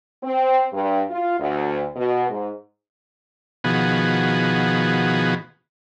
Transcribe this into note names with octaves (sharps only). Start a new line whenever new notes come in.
C4
G2
F4
D2
B2
G#2
B2 D#3 F3 B3 F#4 G#4